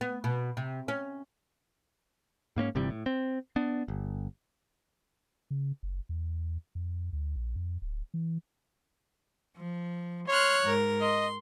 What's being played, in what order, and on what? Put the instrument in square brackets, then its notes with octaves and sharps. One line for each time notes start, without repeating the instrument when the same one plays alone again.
[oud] B3
B2
C3
C#4
[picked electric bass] G#2 A#3 C4 C#4
G1 C3 E3 G3
A2
C4
B3 D4
G1
[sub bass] C#3
F#1
E2
F2
D2
A#1
F2
D1
E3
[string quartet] F3
[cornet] C#5 [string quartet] C6 F6 F#6
[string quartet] G#2 A#4
[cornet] D#5 [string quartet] C6